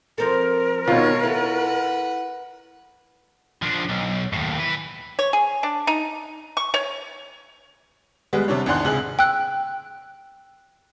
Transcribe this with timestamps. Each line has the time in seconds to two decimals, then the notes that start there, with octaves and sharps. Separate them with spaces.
0.18 F3 C4 A4 A#4
0.88 B2 D#3 D#4 F4 C#5
1.23 E4 A4 B4 F#5
3.62 F3 D4
3.89 B1
4.33 D#2 A2
4.59 E3 B4
5.19 C#5
5.33 G#4
5.63 D4
5.87 D#4
6.57 C#6
6.74 C#5
8.33 G3 G#3 B3
8.48 C3 G3 D4 C#5
8.66 G#1 E2 D4 F#5 C6 F#6
8.85 C#2 C3 G#4 F#7
9.19 G5 E6 F#6